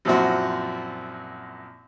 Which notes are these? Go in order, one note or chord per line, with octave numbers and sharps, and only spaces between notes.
F#2 A#2 F3 C4 E4 F#4